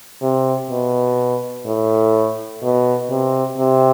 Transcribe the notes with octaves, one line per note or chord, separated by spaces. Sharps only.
C3
B2
A2
B2
C3
C3